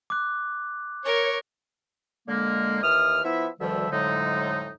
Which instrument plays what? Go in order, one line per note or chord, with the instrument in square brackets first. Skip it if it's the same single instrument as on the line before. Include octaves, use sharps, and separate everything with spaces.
[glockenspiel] D6 F#6
[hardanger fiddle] A#4 [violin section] C#5 C#6
[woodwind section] D3 G#3 A#3
D#2 E3 D#6 F6
F3 B3 E4 E5
D2 B2 D#3 F3 G3 E5
F2 A2 D3 F#3 G#3 D#4